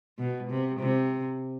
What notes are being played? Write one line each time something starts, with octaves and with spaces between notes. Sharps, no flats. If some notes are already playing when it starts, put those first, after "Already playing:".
B2
C3
C3